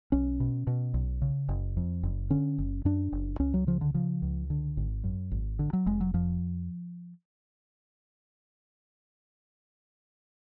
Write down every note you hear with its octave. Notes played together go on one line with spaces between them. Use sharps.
B1 C#4
B2
B2
B1
C#3
F#1
F2
F#1
D3 C#4
F#1
F#2 D4
F#1
C#2 C#4
F#3
C#3 F3
D3
C#3 F3
C#2
D3
G#1
F#2
G#1
D3
F#3
F1 G#3
F#3
F2 F3